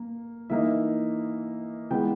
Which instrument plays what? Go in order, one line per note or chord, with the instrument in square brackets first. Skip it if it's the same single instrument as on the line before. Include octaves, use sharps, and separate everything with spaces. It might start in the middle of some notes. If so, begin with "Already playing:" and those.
Already playing: [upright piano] A#3
E3 A#3 D#4 E5
E3 G#3 B3 G5